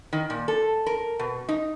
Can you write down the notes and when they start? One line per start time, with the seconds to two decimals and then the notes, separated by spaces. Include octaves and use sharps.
0.13 D#3
0.30 A#2
0.48 A4
0.86 A#4
1.19 B2
1.49 D#4